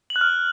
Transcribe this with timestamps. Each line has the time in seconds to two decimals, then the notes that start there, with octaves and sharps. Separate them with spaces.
0.10 F#7
0.16 F#6
0.21 F6